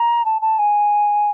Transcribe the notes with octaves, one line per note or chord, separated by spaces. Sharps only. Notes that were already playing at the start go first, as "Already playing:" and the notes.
Already playing: A#5
A5
A5
G#5